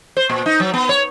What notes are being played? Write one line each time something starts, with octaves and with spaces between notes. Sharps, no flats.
C5
A#2
D#4
F#3
B3
C#5